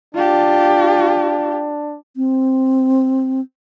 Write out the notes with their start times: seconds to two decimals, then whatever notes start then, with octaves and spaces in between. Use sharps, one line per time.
0.15 D4 F4 G4
2.16 C4